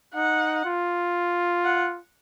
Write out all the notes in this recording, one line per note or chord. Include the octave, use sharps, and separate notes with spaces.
D#4 F#5
F4
F#5